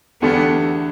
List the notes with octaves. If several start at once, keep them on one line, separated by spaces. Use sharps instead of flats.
E2 D3 A3 B3 D4 G4